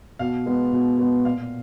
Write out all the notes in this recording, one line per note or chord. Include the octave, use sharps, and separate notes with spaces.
B2 F5
G#3 B3
B2
G#3 B3
A#2 F5